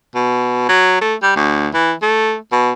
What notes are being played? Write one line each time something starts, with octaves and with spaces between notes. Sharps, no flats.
B2
F#3
A3
G3
D2
E3
A3
B2